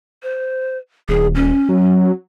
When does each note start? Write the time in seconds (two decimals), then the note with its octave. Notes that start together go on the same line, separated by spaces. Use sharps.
0.23 C5
1.09 D#1 G#4
1.35 C#4
1.69 F#3